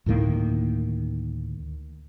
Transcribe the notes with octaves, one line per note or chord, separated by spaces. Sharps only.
D2 A2 D#3 A#3